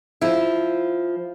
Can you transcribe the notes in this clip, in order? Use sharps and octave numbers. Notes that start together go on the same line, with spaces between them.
F3 E4